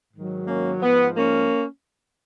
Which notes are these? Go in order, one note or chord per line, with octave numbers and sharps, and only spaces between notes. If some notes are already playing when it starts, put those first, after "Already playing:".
G#2 D#3 F#3
A#3 C#4
G#2 F3 B3
A#3 C#4